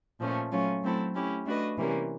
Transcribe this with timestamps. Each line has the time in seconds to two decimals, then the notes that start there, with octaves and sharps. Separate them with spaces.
0.20 A#2 F3 A3 C#4
0.51 F#3 A3 C#4 F4
0.83 F#3 A3 C4 E4 A4
1.14 A3 C#4 E4 G4
1.45 A3 D4 F#4 B4 D#5
1.78 C3 E3 G3 A#3 C#4